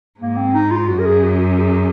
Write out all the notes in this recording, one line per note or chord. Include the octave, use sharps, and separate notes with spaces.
G#2 A#3
C4
D#4
F4
F#2 F#4
A#4
G#4
F#4
F#4
F#4
G#4